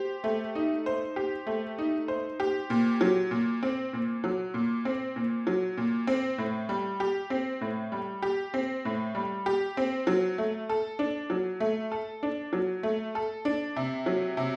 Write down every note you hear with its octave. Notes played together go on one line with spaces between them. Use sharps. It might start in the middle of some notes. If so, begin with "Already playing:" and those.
Already playing: G4 C5
A3
D#4
C5
G4
A3
D#4
C5
G4
A#2
F#3
A#2
C4
A#2
F#3
A#2
C4
A#2
F#3
A#2
C4
A2
G3
G4
C4
A2
G3
G4
C4
A2
G3
G4
C4
F#3
A3
A4
D4
F#3
A3
A4
D4
F#3
A3
A4
D4
C3
F#3
C3